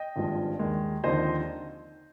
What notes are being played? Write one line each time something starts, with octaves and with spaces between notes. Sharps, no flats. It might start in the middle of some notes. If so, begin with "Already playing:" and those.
Already playing: D#5 G5
G#1 G2 F3 G#3
D#2 D#3 G#3
D#2 D3 F3 C4 D#4 C5 D#5